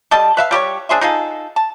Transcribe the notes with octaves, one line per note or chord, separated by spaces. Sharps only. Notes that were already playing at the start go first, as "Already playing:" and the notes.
G3 A4 D#5 A5
B4 E5 F5
G3 G4 C5 C#5
D4 G#4 C5 E5
D#4 F4 G#4 A4
A5